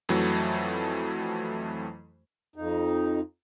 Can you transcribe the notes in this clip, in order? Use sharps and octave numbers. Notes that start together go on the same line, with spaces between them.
F2 E3 F#3 A3
F2 D#4